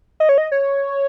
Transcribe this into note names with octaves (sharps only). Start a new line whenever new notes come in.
D#5
C#5
D#5
C#5